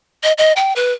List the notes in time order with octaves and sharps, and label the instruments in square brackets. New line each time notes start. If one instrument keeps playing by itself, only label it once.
[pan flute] D#5
D#5
G5
B4